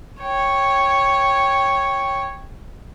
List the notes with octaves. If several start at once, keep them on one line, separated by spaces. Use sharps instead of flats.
C#5 G5